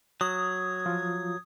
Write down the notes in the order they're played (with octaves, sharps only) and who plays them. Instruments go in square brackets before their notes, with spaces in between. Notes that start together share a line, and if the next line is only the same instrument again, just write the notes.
[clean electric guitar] F#3 [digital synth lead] D#6 [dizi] G#6
[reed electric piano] F3 F4